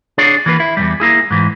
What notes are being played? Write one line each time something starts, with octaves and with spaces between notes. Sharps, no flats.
D4 G#4 C#5 D5
E3 A#3 B4
E4
E2 A#2 G3
A#3 E4 G#4
G#2 E3